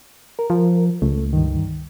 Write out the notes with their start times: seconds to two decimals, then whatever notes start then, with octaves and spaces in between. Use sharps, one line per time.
0.39 A#4
0.50 F3
1.02 C#2 A3
1.33 G2 D#3